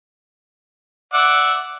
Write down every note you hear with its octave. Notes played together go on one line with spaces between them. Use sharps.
D5 E5 F#5